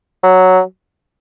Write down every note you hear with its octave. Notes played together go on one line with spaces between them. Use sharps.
F#3